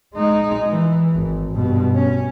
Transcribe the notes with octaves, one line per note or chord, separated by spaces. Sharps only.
G#3 D#4
E3
G#1
G2 B2
C#4